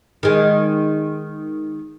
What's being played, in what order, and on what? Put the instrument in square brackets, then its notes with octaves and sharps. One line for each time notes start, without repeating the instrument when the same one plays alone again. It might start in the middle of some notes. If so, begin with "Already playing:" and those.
[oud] D#3 G#3